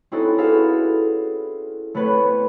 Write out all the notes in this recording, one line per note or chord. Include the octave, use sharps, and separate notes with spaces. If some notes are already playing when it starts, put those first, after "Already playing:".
C4 C#4 D#4 E4 F#4 A4
F#4 G#4 A4 B4 E5 F5
A3 B3 C4 B4 C#5